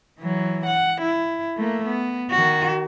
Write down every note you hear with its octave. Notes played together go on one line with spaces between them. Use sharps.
E3 F#3
F#5
E4
A3 A#3
B3
D#3 F#4